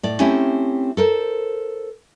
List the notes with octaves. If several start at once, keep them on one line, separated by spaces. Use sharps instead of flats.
A2 D5
A3 C4 C#4 E4 G4 G#5
A4 A#4 C5